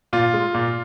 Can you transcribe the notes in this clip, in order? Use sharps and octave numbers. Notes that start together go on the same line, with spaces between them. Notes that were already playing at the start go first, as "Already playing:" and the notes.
A#2 F4
G#3
A#2